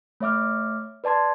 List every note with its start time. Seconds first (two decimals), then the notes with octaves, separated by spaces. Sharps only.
0.20 A3 C#5 E5 D6 F6
1.04 B4 D5 A5 C6 G#6